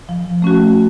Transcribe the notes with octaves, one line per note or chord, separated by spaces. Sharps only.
F3
A3 C#4 F#4